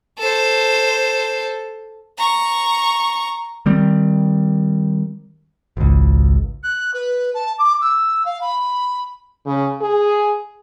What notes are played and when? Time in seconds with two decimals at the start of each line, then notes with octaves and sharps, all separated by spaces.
0.19 A4 C5
2.18 A#5 C#6
3.66 D#3 G3 C4
5.77 G#1 C#2
6.63 F#6
6.94 B4
7.34 A5
7.58 D6
7.81 E6
8.25 F5
8.41 B5
9.46 C#3
9.81 G#4